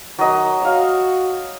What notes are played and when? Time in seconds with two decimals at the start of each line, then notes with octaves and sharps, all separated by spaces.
0.19 D#3 F#3 D#5
0.61 F#4 C#5 F5